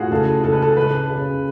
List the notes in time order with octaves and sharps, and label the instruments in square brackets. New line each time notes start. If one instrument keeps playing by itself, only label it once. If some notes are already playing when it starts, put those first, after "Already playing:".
Already playing: [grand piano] A2 [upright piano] F4 F#4 G#4
[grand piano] C#2 [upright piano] A4
[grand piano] C#2 [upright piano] A4
[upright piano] B4
A4
[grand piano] C#2 [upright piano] B4
[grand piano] C#3